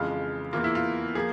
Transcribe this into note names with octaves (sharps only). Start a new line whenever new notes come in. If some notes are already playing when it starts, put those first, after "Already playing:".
Already playing: F2 C#3 E3 G#3 F4
E2 E3 A#3 F4
E4
F4
F3 A#3 G#4